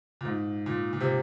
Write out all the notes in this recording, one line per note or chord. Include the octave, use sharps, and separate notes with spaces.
A#2
G#2
A#2
A#2
C3